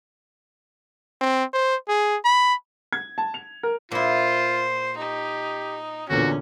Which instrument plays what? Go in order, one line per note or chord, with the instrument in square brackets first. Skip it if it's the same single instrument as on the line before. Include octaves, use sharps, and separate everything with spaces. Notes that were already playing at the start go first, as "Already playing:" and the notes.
[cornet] C4
C5
G#4
B5
[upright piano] G#6
A5
F7
A#4
[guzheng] A#2 E4 [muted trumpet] F4 [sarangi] C5
[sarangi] D#4 [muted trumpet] G4
[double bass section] E2 A#2 D3 [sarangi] C#4 [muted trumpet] F#4